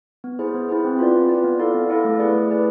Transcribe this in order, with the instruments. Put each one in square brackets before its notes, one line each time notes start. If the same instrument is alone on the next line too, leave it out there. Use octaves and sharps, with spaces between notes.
[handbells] B3
E4 G#4 C5
B3
E4 G#4 C5
C4
F4 B4 D5
C4
F4 B4 D5
B3
E4 A4 D5 F5
B3
E4 A4 D5 F5
A3
E4 G#4 B4 D5
A3
E4 G#4 B4 D5